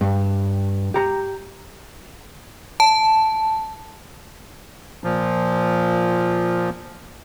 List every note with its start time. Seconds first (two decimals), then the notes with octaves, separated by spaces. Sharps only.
0.01 G2
0.94 G4 A#5
2.80 A5
5.04 A#2 F3